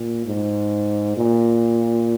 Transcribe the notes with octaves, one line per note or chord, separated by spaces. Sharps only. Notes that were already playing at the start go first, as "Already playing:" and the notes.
Already playing: A#2
G#2
A#2